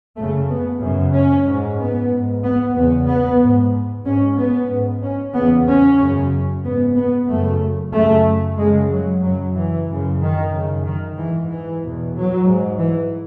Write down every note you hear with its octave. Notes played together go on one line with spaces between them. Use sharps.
F#2 C#3 A3
B3
F#2 C#3
C#4
G#2
B3
G#2
B3
E2 C#3 B3
B3
G#2
G#2 C#4
B3
G#2
C#4
E2 C#3 B3
C#4
F#2 C#3
G#2 B3
B3
F#2 C#3 A3
F#2 C#3 A3
F#2 C#3 G#3
F#3
F#2 C#3 F#3
E3
F#2 C#3
D#3
F#2 C#3
D#3
G#2 E3
E3
E2 B2
F#3
G#2
E3